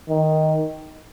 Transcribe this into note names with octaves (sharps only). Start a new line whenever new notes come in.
D#3